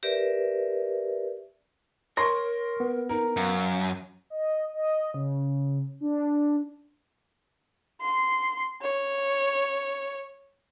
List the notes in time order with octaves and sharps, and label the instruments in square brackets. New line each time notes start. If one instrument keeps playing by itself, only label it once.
[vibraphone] G4 A#4 B4 D5 E5
[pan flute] A#4 [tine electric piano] C#5 [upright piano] C6 C#6 A#6
[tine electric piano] B3
[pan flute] D#4 [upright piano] A#4
[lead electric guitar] F#2 [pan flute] F5
[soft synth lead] D#5
D#5
C#3
D4
[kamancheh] C6
C#5